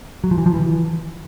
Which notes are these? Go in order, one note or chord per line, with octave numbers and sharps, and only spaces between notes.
F#3
F3
E3
F3
E3